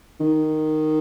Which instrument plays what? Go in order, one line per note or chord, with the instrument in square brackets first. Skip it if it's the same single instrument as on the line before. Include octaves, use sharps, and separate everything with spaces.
[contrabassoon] D#3